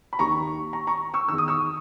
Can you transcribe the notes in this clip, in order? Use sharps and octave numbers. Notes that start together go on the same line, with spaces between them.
B5
D#2 D#3 A#5 C#6
A#5 C#6
A#5 C#6
C#6 E6
E2 D#3 E6
D#6
C#6 E6